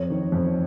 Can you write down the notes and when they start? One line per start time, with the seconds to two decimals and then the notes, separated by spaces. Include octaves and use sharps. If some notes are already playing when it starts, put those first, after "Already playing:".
Already playing: F2 C#5
0.10 D#3
0.32 F2